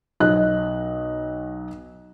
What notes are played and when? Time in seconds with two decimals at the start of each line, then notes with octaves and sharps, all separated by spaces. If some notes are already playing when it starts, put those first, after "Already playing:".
0.20 B1 D#5 F#6